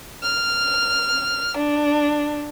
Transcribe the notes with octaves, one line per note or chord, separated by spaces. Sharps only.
F6
D4